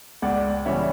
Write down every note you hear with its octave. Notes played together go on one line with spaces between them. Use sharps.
C#2 D5 F#5
C#3 E3 G3 C#5 E5